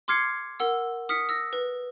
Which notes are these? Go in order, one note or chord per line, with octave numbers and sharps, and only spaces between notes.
C6 D6 F6 G#6 C7 C#7
A#4 F#5 E6
D#6 F6 B6 C#7
E6 A#6
B4